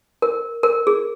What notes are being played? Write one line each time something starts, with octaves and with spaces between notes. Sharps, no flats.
A#4
A#4
G#4